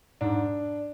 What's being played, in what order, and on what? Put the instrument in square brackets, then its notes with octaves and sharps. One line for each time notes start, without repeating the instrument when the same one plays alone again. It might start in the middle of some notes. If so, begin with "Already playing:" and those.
[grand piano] G#2 D4